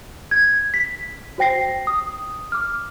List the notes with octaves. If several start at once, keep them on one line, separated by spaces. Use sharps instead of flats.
G#6
B6
F#4 C5 G5 A#6 C7
D#6
D6 F6